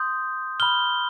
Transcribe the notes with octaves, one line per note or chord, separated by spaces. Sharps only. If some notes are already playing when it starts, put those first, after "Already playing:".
Already playing: C6 D#6 G6
B5 F6 G7